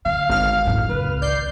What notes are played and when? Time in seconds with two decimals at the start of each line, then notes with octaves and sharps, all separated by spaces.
0.06 D3 F5
0.30 G#1 F6
0.65 F2 A2
0.89 C#2 B4
1.22 D5 G6 C7